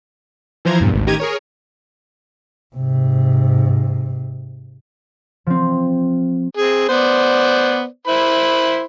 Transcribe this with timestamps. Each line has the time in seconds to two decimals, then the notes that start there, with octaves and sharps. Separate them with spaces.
0.65 E3 F3 C5 A#5 G#6
0.80 E2 G2 A#2
0.93 G#1 D2
1.07 A1 D#3 G4 A#5 G#6 D#7
1.20 G#4 A#4 C#5
2.76 G#2 C3
5.47 F3 C4
6.57 C4 G#4
6.89 B3 C5 D5
8.07 E4 C5 B5